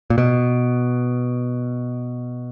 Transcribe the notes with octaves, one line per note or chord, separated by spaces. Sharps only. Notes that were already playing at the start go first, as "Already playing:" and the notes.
A#2
B2